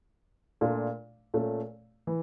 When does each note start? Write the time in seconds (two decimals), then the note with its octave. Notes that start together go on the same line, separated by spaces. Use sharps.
0.61 A#2 A3 D4 F4
1.34 A#2 A3 C#4
2.07 E3